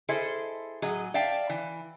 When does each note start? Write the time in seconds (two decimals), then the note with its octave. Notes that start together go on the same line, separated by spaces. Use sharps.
0.09 E4 G#4 A4 C5 D#5 E5
0.82 A2 F#3 G#4 D#5
1.14 D5 E5 F5 G5 A5
1.50 E3